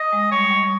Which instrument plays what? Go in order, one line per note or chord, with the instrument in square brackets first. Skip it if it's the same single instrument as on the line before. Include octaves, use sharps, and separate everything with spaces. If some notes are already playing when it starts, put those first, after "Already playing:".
Already playing: [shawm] D#5
[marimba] G#3
[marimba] G3 [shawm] C#5
[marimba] G3
G3